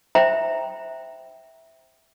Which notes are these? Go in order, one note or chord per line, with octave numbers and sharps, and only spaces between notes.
C5 E5 G5 A#5